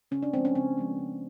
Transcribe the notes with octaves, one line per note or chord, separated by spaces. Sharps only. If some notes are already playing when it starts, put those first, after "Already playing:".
C#3 C#4
D4
F3 G#3 B3 C4
C#4
C#3 C4
F3 G#3 B3
C#3